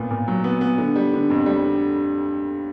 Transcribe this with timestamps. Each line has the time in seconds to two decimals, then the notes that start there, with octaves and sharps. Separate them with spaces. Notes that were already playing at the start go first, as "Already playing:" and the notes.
Already playing: A#2 B3
0.11 A#2
0.28 F#3
0.44 B3
0.61 B3
0.78 D3
0.96 G3
1.13 D3
1.30 F2
1.46 G3
1.63 D3